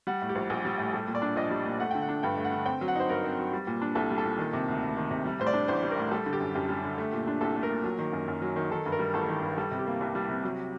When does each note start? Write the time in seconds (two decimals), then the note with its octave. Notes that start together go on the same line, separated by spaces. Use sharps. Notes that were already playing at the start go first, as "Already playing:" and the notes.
0.07 G3 F#5
0.22 A2
0.29 G4
0.35 A#1
0.50 A#1
0.65 G3
0.78 A2
0.93 G3 A4
1.07 A#2
1.15 D5
1.22 D4
1.36 A#1 D#5
1.50 G3
1.66 A#2
1.80 A3 F#5
1.91 D3 G5
2.02 F#5
2.09 D4
2.23 G2 G5
2.38 A3
2.44 F#5
2.52 D3
2.66 C4 G5
2.81 F#3
2.88 F#5
2.96 D#4 C5
3.09 G2 A#4
3.24 C4
3.39 F#3
3.53 G3
3.67 A#2
3.81 D4
3.95 C2 A4
4.10 G3
4.18 A4
4.25 A#2
4.39 D#3
4.53 C3
4.68 D2
4.83 D2
4.97 D#3
5.11 C3
5.26 G3
5.40 A2 C5
5.47 D5
5.54 D4
5.68 A1 C5
5.83 G3
5.91 A#4
5.98 A2
6.11 G3 A4
6.26 D3
6.33 G4
6.40 F#2
6.55 F#2 G4
6.69 G3
6.84 D3
6.98 A3
7.13 A#2
7.27 D4
7.41 C2 A4
7.56 A3
7.63 A#4
7.70 A#2
7.84 F#3
7.99 D#3
8.13 F#2
8.28 F#2
8.42 F#3
8.56 D#3
8.71 D#3 A4
8.86 G2
8.92 A#4
8.99 G3
9.13 A1 A4
9.29 D#3
9.42 G2
9.58 G3 A4
9.71 C3
9.79 G4
9.87 A#3
10.01 C2
10.15 G3
10.29 C3
10.44 F#3